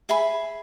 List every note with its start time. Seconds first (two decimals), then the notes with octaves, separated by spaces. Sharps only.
0.09 G#4 E5 G#5 B5